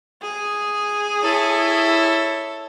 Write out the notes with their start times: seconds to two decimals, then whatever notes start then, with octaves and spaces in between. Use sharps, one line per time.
0.22 G#4
1.21 E4 A4 C#5